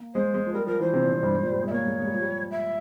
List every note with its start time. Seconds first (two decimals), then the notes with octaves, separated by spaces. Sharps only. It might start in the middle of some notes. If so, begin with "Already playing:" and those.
Already playing: A#3
0.15 G#3 C5
0.34 G#3
0.47 F3
0.53 G3 A#4
0.67 F3 A#4
0.80 E3 C5
0.93 C3
1.03 A#2
1.12 C3
1.23 G2
1.33 G#2
1.43 A#2
1.52 G3
1.62 G#3
1.67 E5
1.71 A#3 C#5
1.85 G#3
1.99 G#3
2.07 G3
2.14 F3
2.22 G3
2.51 E5